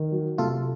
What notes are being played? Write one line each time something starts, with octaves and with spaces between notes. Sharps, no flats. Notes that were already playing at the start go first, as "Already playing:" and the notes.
Already playing: D#3
F#3
C3 F4 A4